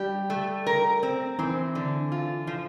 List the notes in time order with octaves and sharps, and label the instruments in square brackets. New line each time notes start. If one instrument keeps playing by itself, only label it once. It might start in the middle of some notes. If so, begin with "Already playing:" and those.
Already playing: [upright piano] G3 [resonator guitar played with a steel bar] G4
[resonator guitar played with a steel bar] A3
A#4
C4
[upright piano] E3 [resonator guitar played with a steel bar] C4
[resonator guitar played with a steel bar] D3
F4
F3